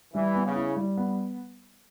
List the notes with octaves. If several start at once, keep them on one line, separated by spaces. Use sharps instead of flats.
E3 G3
B3
C#3
E4
G3
B3